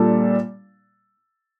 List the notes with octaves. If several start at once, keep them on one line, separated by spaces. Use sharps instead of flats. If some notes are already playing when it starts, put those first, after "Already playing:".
Already playing: A#2 G3 D4 A4